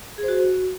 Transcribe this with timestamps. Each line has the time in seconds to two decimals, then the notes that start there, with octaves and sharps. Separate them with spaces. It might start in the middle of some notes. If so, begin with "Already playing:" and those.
0.18 G#4
0.23 C5
0.28 F#4